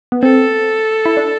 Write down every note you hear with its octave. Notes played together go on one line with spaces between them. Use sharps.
B3
C4 A4
E4
D4